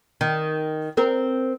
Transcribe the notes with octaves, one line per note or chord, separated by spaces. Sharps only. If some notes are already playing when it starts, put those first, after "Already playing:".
D#3
C4 A#4